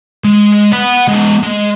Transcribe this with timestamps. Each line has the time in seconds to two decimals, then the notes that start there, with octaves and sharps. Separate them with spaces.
0.24 G#3
0.73 F#5 B5
1.07 G#3 B3
1.43 G#3